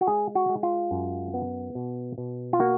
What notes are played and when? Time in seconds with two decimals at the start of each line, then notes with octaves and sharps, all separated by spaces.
0.01 F#4
0.07 G#3 G#4
0.35 F#4
0.49 G#3
0.63 F4
0.91 F#2
1.34 B3
1.75 B2
2.18 B2
2.53 F4
2.60 A#3 F#4